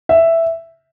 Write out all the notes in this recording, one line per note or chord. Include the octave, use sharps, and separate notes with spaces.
E5